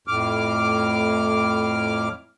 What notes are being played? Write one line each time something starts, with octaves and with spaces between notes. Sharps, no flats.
F2 A2 D6 F6